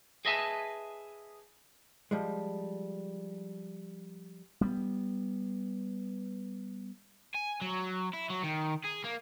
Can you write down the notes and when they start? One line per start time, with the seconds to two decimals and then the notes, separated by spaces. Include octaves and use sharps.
0.25 G#4 B4 D#5 E5 G#5 A5
2.11 F3 G3 G#3
4.61 G3 A#3 B3
7.34 G#5
7.61 F#3
8.14 E4
8.30 F#3
8.44 D#3
8.85 G#4
9.05 A#3